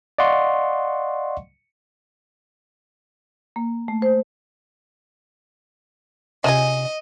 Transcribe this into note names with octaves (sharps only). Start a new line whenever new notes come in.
D5 D#5 F5 F#5 C6 C#6
A#3
A3
C5
C3 C#4 F4 G#4 D#5